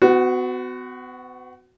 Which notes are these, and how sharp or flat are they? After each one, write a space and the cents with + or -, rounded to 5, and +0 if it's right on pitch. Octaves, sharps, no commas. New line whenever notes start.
B3 +40 F#4 +0